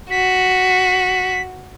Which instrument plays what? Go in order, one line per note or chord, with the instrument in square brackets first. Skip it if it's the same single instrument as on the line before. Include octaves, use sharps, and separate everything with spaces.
[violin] F#4 [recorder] B6